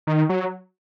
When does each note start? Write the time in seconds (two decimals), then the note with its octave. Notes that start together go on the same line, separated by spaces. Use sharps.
0.07 D#3
0.29 F#3